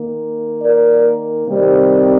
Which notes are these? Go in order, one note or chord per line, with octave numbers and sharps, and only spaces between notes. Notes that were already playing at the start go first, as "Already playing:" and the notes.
Already playing: D#3 A#3
A#4 D5
C3 D#3 G3 C4